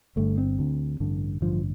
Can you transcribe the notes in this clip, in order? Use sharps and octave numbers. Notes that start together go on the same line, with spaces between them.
G1 G2 D3 A3
C4
D2 D3
A1 G2 D3
A1 G2 D3 F3